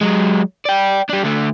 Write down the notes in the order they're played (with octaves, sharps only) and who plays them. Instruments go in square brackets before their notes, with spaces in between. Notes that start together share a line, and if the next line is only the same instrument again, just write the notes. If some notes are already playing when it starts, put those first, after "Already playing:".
[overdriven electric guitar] F#3 G#3
D5 G5
D4 G4
D2 D3